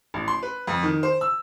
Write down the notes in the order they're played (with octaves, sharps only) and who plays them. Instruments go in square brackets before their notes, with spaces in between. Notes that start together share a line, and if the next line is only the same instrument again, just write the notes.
[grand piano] A1
C6
B4
F2
D#3
C5
E6